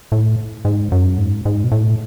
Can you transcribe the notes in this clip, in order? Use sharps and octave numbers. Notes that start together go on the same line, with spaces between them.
A2
G#2
F#2
G#2
G#2
B2
A2